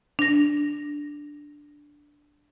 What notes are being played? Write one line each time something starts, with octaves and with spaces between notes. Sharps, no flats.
D4 A#6